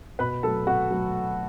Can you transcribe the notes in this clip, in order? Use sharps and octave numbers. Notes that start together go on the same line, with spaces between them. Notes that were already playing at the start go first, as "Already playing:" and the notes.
B2 B4 B5
F#3 A3 A4 A5
B2 F#4 F#5
F#3 A3